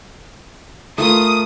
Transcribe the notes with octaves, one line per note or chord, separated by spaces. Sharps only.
A3 F4 A#4 D#6